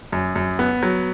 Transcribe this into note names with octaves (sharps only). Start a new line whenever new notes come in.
F#2
F#2
B3
F#3